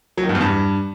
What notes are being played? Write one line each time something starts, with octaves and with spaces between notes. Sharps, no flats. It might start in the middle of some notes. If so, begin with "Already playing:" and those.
F#3
D#3
G2
E2
G2